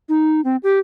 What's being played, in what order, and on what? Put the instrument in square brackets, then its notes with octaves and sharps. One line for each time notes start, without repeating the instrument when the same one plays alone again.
[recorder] D#4
C4
G4